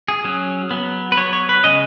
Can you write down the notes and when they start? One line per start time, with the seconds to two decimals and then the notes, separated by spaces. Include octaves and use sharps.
0.08 G#4
0.24 F#3 C#4
0.71 F#3 B3
1.12 B4
1.17 F#3 B3 C#5
1.33 C#5
1.49 B4
1.64 C#3 G#3 C#4 D#5